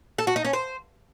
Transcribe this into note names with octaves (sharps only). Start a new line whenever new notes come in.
A4
F#4
D#4
C#4
C5